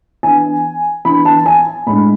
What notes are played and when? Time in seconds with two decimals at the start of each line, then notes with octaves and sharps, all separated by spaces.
0.23 E3 B3 D4 G#5
1.05 E3 B3 D4 B5
1.25 A5
1.46 G#5
1.86 A2 G#3 D4 B5